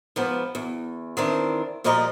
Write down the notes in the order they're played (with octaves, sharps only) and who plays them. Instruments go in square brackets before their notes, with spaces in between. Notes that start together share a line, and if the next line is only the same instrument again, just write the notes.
[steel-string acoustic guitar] G#2 F3 B3
E2
D#3 E3 C4 D4
A#2 F3 G3 D5 D#5 A#5